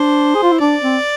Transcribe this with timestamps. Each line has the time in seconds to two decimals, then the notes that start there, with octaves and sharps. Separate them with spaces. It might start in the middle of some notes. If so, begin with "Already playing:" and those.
Already playing: D4 C5
0.35 G#4
0.42 F4
0.52 E4
0.60 D4 D5
0.82 C4